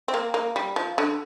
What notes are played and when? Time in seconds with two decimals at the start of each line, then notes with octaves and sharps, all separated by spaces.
0.08 C4
0.14 A#3
0.34 A#3
0.56 G3
0.76 F3
0.98 D3